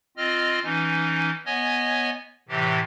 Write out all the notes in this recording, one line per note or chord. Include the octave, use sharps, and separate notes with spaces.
C4 F4 D#5 F6
E3 C#4 D#4
B3 C#5 D#5 G#5
A2 C3 E3 G4